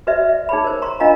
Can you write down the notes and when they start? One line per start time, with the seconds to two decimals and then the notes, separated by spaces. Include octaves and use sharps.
0.07 F#4 B4 C5 D5 E5
0.29 E5
0.49 D#4 G#4 C#5 B5
0.64 A#4 C5
0.82 A#5 C6
1.00 D4 F4 A#4 D#5 F5 A#5